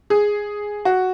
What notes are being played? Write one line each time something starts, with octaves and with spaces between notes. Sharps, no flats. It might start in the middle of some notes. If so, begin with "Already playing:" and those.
G#4
F#4